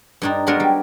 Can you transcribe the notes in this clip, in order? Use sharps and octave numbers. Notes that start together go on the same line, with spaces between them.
G2 D4 D#4
F#3 G#3 B3 D4 A#4 C#5
G3